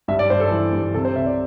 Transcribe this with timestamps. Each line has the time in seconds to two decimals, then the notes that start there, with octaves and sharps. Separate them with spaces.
0.08 G2 E5
0.19 D5
0.30 G2 C5
0.40 A4
0.51 E3
0.73 G2
0.94 C3 A4
1.05 C5
1.16 C2 E5
1.26 D5